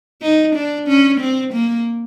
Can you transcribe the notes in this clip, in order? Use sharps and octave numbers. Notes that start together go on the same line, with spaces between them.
D#4
D4
C#4
C4
A#3